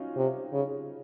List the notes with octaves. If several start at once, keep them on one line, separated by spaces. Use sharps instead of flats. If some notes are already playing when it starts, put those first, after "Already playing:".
Already playing: C#4 D#4 F4 F#4
C3
C#3